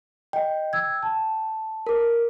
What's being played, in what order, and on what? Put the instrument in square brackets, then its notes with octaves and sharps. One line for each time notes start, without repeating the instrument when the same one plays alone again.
[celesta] D#5 [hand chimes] G5
[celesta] E6 G#6
A5
[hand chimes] A#4 D6